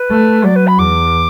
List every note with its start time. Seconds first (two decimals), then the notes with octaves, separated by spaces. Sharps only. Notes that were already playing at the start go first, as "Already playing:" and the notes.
Already playing: B4
0.11 A3
0.44 F#3 D5
0.56 B4
0.67 B5
0.78 E2 D6